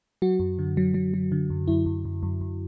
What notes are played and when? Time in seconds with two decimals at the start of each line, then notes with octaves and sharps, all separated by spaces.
0.22 F#3 F#4
0.39 F#2
0.59 D3
0.77 F#3
0.94 F#3
1.14 F#3
1.32 D3
1.50 F#2
1.68 F#2 E4
1.86 F#2
2.05 F#2
2.23 F#2
2.41 F#2